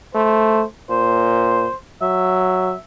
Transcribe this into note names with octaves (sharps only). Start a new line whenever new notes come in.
A3 C5
A#2 C5
F#3 E5